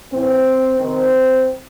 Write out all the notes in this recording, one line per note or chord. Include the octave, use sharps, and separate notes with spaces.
A2 E3 C4
C3 D#3 C4